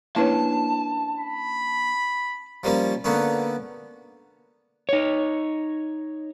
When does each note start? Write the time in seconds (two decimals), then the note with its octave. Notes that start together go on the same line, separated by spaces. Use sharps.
0.16 A#3 C#4 D4 E4 B4 C#5 A5
1.19 B5
2.64 F3 G3 A#3 C#4
3.04 D3 A#3 B3 C#4
4.89 D#4 C#5